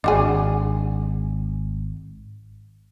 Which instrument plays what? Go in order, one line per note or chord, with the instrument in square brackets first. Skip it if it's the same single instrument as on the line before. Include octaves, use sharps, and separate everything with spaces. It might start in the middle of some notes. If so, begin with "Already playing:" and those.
[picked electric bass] G#1 [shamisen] D4 F#4 G#4